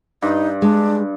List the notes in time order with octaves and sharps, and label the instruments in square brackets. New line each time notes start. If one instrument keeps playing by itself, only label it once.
[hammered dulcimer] G2 [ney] D#4
[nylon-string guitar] G#3 [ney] D4